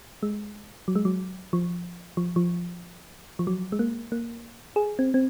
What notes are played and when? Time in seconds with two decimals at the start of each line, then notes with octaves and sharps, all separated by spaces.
0.23 G#3
0.88 F#3
0.96 G#3
1.05 F#3
1.53 F3
2.17 F3
2.36 F3
3.39 F3
3.47 F#3
3.72 G#3
3.79 A#3
4.12 A#3
4.76 G#4
4.99 C4
5.14 C4